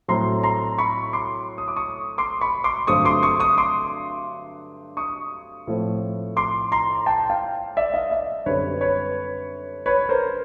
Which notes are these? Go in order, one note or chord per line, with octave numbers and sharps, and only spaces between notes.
A2 F#3 A3 C4 A#5 C6
A#5 C6
B5 C#6
C6 D6
D#6
D6
C#6 D#6
C6 D6
B5 C#6
C6 D6
G2 D3 F#3 A3 C4 C#6 D#6
C6 D6
C#6 D#6
C#6 D#6
C6 D6
C#6 D#6
A2 F3 A3 C4
C6 D6
A#5 C6
G5 A5
F5 G5
D5 E5
D#5 F5
D5 E5
F#2 D3 G3 C4 B4 C#5
B4 C#5
B4 C#5
A#4 C5